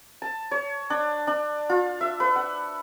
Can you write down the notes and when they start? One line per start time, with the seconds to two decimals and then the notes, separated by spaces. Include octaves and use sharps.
0.22 A5
0.51 C#5
0.90 D4
1.27 D4
1.70 F4
2.01 E5
2.20 B4
2.36 F#5